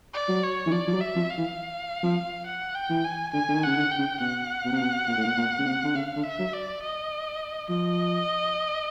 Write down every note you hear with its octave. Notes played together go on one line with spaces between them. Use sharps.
D5
F#3
C#5
E3
F3 D5
F3
F#3
E5
F3
F5
E3
F3
F#5
G5
E3
G#5
D3 G#5
D3
D#3
C#3 F#5
D3
G5
C#3
B2 F#5
B2
C3
B2
A#2
A2
A#2
A#2
C#3
C3
D3
C#3 F5
D3
E5
F#3
D5
D#5
F3 D#5